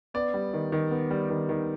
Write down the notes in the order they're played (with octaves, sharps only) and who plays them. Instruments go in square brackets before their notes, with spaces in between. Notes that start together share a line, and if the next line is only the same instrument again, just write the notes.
[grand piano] B3 D5
G3
D#3
D#3
B3
G3
D#3
D#3